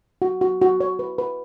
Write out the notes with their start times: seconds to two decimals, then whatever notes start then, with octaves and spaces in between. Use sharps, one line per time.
0.22 F#4
0.41 F#4
0.61 F#4
0.80 C#5
0.99 B4
1.18 B4